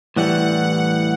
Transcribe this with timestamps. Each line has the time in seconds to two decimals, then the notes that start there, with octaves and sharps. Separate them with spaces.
0.16 A2 E3 G3 F#5